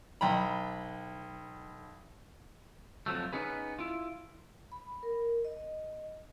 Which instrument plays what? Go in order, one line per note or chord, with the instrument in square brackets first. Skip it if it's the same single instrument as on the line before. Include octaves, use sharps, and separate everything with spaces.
[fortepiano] B1 G5 A#5 B5
[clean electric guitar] F2 F3 F#3 A3
B3 C#4 D#4 G#4 B4
E4 F4
[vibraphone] B5
A#4
D#5